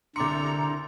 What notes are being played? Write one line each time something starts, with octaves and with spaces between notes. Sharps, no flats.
C2 D3 A#5 C6 D6 A6 C#7